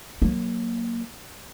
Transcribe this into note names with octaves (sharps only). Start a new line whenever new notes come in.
F#3 A#3